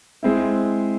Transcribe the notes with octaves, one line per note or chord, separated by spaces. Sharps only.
G#3 C4 E4